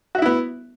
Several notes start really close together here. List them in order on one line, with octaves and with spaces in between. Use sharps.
F#4 E5 E4 B3